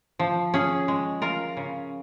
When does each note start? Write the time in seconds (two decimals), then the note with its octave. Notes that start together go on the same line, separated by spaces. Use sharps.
0.19 F3
0.54 C#4 G#4
0.88 G#3
1.22 F4 A#4
1.57 C#3